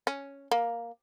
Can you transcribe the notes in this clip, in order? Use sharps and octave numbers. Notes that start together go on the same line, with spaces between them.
C#4
A#3